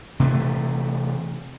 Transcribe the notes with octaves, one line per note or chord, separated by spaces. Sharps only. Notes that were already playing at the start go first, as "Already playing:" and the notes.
C3 E3 A3